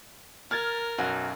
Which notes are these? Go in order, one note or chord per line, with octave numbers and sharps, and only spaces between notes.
A#4 F6 G#6 A6
B1 F#2 F#4